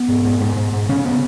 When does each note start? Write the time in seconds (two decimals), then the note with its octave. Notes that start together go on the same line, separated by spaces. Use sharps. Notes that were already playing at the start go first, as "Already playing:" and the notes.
Already playing: B3
0.08 G#2
0.25 G#2
0.40 G#2
0.56 G#2
0.72 G#2
0.89 C#3 C#4
1.05 B3